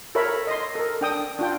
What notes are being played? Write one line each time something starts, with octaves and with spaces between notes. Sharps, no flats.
A4 A#4 C#5 E5 B5
D#5 C6
A4 A#4
D4 G5 D#6
D4 F4 G5